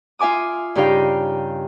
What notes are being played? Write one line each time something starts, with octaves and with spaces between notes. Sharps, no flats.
F4 E5 G#5 D6 D#6
G2 C#3 D#4 G4 F5 G5